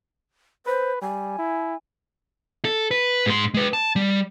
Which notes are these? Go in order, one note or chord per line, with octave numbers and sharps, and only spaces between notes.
B4 C5
G3 G#5
E4
A4
B4
G#2 C6
G#3 B4
A5
G3